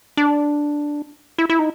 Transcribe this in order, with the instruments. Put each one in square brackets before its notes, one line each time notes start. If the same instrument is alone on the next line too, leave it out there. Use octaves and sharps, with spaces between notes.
[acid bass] D4
E4
E4
D#4